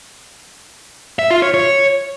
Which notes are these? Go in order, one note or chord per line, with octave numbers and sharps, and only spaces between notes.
E5
F4
C#5
C#5